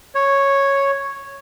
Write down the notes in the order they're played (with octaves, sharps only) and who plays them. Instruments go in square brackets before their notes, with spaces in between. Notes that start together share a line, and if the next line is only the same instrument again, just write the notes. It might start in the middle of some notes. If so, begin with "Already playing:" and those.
[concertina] C#5